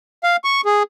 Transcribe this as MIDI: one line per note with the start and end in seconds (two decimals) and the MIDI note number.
0.24 0.36 77
0.44 0.61 85
0.65 0.83 68